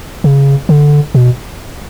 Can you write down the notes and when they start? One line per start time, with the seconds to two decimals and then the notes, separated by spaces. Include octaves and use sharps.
0.24 C#3
0.69 D3
1.15 B2